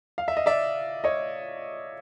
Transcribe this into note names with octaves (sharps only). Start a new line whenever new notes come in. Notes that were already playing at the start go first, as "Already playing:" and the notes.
F5
E5
D#5
D5 E5
C#5 D#5